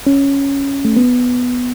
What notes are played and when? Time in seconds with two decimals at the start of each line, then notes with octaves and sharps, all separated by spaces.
0.06 C#4
0.85 A3
0.96 B3